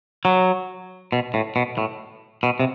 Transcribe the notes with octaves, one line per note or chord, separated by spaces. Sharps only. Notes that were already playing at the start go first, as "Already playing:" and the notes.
F#3
B2
A2
B2
A2
B2
C3